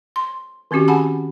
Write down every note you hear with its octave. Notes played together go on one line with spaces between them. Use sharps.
C6
D#3 C4 C#4 F#4 G4
G#4 F#5 G#5 A5 B5